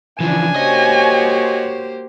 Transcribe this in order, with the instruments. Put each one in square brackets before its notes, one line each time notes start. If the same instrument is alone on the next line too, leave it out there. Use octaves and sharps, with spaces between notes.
[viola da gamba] C#3 D4 [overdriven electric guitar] E3 F3 [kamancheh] G#5
[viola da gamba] A#3 G4 C5 [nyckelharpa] F#4 C#5 [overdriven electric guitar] D#5